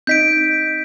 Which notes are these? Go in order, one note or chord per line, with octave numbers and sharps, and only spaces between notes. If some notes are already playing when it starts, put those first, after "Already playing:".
C4 D#4 D#5 G6 B6 D7